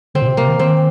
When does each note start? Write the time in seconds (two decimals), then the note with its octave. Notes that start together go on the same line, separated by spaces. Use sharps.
0.15 D3 C4
0.22 A#2
0.27 C3
0.37 C3 A#3
0.48 D#3
0.59 D#3 C4